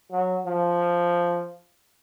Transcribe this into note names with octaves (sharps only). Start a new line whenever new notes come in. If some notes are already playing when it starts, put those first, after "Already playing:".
F#3
F3